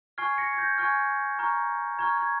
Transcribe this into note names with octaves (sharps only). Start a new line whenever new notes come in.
G#5 C#6 F6 G#6 C7
A#6 C#7
G#6
G6 A#6
G#5 C#6 F6 G#6
A#5 C#6 F6
A#5 C#6 F6 G#6
G#6